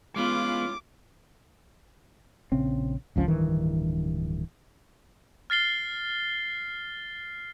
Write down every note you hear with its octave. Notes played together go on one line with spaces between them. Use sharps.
E3 G#3 B3 C#4 F4 D6
A#1 C#3 C4
G1 C#2 F3 C#4
D1 G2 D#3 E3
F6 A6 C7 G7